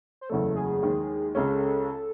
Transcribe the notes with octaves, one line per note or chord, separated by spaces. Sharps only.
C5
F#1 E2 C#3 F#3 A3 A4
G#4
D#2 D#3 G#3
C#2 C#3 G#3 C#4 A4